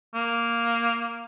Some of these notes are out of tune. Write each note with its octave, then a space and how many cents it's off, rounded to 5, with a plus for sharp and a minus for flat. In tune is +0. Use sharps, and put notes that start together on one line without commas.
A#3 +0